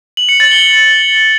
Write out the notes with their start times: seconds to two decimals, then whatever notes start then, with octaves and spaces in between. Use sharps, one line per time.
0.17 F#7
0.29 C#7
0.40 A6
0.51 G7